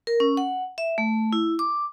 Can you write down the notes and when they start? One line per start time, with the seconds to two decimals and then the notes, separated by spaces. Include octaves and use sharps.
0.07 A#4
0.20 C#4
0.37 F#5
0.78 E5
0.98 A3
1.33 E4
1.59 D6